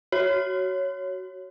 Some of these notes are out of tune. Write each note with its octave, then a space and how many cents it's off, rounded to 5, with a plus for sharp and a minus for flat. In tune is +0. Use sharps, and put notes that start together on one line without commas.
F#4 +20 C#5 +0